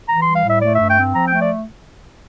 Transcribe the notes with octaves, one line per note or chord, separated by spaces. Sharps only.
E3 A#5
G3 C6
F5
A2 E5
A3 D5
G2 E5
G5
C4
F3 A#5
G5
A3
D5